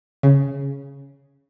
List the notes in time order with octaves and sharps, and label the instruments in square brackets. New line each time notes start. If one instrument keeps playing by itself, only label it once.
[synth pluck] C#3